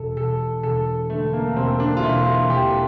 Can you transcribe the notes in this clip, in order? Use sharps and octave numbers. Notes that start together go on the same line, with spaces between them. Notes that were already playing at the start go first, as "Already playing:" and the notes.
Already playing: E1 A4
E1 A4
E1 A4
D3 A3
A#3
E1 C4
D4
F4
E1 E4
F4
E1 G4